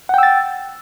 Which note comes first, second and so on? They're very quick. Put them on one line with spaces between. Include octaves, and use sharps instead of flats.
F#5 G5 E6 A6